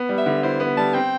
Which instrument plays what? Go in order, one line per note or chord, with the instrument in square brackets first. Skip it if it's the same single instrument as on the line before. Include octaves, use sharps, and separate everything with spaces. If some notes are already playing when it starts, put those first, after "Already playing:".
Already playing: [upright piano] B3
G3
[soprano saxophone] E5
[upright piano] D3
[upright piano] E4 [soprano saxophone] C5
[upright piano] B3
[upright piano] G3 [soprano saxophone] A5
[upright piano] C4 [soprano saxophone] G5